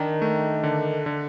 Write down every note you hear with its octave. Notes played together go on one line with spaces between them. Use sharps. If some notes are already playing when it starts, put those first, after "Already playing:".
Already playing: D#3 D4
A3
D3
D3